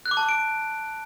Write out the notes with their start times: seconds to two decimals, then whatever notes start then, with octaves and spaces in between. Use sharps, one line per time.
0.06 F#6
0.11 D6
0.17 A5
0.23 D6
0.29 D7